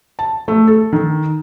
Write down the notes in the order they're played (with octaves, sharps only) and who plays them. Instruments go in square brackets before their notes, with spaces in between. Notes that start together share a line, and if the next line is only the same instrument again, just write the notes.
[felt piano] A5
A3
A4
D#3